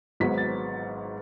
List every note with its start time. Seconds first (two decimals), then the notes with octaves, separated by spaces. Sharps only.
0.20 G#1 G#2 F#3 B3 B6
0.38 A6